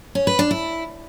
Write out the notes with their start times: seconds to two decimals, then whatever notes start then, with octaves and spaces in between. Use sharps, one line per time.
0.15 C#4
0.27 B4
0.39 D4
0.51 E4